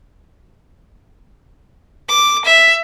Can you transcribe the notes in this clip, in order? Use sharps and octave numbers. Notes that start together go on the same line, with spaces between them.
D6
E5